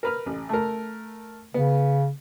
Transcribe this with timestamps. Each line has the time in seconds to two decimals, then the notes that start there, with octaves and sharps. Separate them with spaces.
0.03 A#4 B4 F6
0.26 A1
0.49 A3 A#4
1.54 C#3 B3